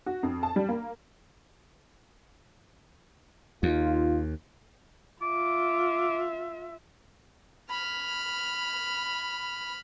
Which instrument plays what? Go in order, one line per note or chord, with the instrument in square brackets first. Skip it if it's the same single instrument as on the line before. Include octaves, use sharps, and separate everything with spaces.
[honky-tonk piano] F#4
F2
A5
G3
A#3
[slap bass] D#2 [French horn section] D#4 F4
[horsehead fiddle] F4 E5 [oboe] D6
[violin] B5 F6